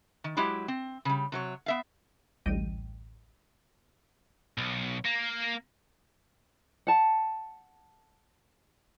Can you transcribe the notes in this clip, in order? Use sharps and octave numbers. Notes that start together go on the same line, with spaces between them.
D#3
F#3 G#3 E4 G4
C4
C#3 G3
C3 F#3 C#5
B3 E5 F5
A1 D2 G3 D#5 G5 D#7
B1
A#3
F#5 A5